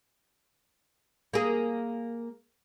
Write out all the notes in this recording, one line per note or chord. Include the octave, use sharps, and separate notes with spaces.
A#3 G#4